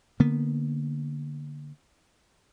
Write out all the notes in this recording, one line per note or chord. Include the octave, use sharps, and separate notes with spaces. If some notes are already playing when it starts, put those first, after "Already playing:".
D3 A#3 B3